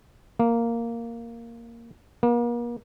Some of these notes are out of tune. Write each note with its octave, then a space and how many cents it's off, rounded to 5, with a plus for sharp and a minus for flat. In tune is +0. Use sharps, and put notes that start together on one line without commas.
A#3 -5
A#3 +40